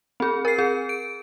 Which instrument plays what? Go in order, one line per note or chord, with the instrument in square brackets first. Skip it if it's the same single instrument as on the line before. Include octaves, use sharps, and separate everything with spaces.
[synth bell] C4 G#4
A#4 C7
G#4
D7